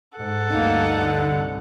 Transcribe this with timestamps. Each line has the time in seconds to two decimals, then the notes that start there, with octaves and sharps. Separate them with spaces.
0.17 G#2 A4 F#5
0.51 D2 G2 A#3 D#4
0.94 D3
1.29 C2